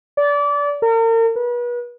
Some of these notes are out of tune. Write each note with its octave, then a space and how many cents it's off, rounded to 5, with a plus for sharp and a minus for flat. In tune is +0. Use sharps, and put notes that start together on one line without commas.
D5 -25
A#4 -40
B4 -35